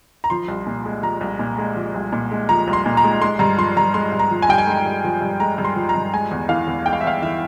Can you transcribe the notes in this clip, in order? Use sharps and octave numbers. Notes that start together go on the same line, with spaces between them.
A#5
F3 C6
C2
A#2
G#3
F3 A#5
C2
A#2
G#3
F3
C2
A#2
G#3
F3 A#5
C2
C6
A#2
A#5
G#3
G#3 C6
G2 A#5
F3 C6
G2 A#5
G#3 C6
G2
A#5
F3
G#5
G2 G5
G#5
G#3
G2
F3
G2
G#3 A#5
G2
C6
F3
A#5
G2
G#3 G#5
E2
E3 F5
E2
G#3 G5
F5
E5
E2 F5
E3 E5